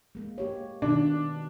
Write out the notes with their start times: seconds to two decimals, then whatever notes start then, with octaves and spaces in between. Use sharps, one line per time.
0.15 G#3 A#3
0.38 A#3 G4 C#5
0.82 B2 D#3 D4